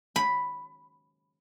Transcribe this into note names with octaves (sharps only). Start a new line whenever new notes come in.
B5